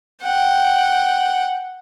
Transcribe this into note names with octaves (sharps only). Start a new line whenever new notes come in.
F#5 G5